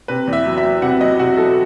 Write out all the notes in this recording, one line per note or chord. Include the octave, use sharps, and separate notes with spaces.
C3 B4
E2
E5
F#3
E5
F#3
C3 F#5
F#3 D#5
C3 F#4
F#3 A4